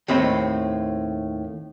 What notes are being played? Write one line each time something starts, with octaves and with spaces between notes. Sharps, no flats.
D#2 A2 C4 D#5 B5